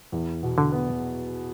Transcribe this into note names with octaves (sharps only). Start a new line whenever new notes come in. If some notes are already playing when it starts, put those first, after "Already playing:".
E2
B2
D3
B3